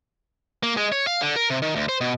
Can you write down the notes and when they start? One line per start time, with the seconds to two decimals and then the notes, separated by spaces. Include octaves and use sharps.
0.63 A#3
0.77 G#3
0.92 C#5
1.07 F5
1.21 D3
1.36 A#4
1.50 C3
1.62 D#3
1.76 D2
1.89 C5
2.01 B2